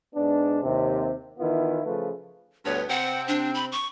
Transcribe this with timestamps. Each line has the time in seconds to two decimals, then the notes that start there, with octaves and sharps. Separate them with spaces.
0.15 G#2 B3 D4
0.63 D#2 C3
1.39 D#3 E3 B3 E4 F4
1.86 C#3 F3 A3 F4 B4
2.65 D2 G2 B3 C#5
2.89 C3 C4 F#5
3.28 D4
3.54 B5
3.72 C#6